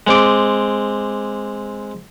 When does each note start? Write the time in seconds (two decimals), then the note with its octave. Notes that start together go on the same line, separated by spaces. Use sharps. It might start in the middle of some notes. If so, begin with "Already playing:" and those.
0.07 G#3 C4 D6